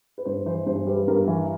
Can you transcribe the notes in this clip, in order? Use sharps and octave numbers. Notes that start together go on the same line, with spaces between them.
B4
G2 C5
E3 C5
G2 C5
G3 B4
G2 A#4
E3